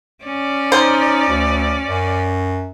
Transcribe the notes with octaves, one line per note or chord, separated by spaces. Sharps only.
C#4 D5
D#4 C5
D2
F#2